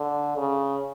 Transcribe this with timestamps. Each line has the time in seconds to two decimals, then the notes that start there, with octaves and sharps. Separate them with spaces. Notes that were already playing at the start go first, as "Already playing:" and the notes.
Already playing: D3
0.37 C#3